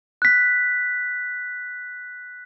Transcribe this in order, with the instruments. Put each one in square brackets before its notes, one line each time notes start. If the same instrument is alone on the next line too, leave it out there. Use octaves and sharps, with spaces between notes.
[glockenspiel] F#6 B6